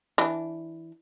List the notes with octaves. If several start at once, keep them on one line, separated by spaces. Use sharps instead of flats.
E3 D4